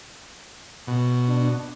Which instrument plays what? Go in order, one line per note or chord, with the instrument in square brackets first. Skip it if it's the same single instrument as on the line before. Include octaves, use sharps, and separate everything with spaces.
[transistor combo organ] B2
[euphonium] D4